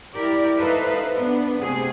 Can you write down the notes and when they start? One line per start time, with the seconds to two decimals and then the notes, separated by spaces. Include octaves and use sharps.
0.14 E4 G4 A#4 D5
0.58 D#4 A4 B4 C5 E5 F5
1.14 B3 D4
1.61 C3 A3 G#4 C5